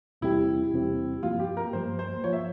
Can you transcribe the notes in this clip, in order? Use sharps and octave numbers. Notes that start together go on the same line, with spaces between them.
E2 C3 G3 C4 E4 G4
E2 C3 G3 C4 G4
G2 F3 A#3 F4
G4
A#4
G2 F3 A#3 C5
C5
F3 A#3 F4 C#5
E5